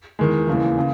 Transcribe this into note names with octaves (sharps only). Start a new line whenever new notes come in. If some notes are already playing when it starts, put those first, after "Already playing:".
E2 D#3 G#3
D#2 C#3 E3
C#3